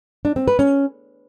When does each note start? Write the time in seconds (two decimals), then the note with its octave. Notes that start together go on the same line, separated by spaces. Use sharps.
0.25 D4
0.36 C4
0.48 B4
0.59 C#4